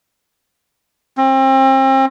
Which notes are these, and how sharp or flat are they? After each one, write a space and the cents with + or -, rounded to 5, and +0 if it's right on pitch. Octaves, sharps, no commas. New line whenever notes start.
C4 +35